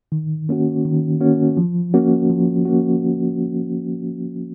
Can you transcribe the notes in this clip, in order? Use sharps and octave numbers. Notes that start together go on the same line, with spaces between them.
D#3
A#3 C#4 F#4
D#3
A#3 C#4 F#4
F3
A#3 C#4 F#4
F3
A#3 C#4 F#4